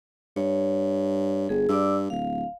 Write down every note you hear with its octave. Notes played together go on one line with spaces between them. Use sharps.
G2 C#5
G1 G#4
G2 D5 D6 E6
D1 F5